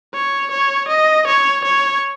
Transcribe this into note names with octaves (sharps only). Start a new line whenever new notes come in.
C#5
C#5
D#5
C#5
C#5